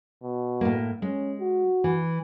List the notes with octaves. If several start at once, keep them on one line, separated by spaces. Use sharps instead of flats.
B2
A2 A#3
G#3 C#4
F#4
E3